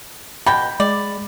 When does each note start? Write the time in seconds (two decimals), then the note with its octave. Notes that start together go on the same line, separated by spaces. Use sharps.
0.46 B2 G5 B5
0.80 G#3 D5